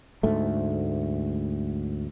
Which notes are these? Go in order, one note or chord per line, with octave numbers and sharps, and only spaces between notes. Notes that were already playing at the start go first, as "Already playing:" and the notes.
D2 G#2 A3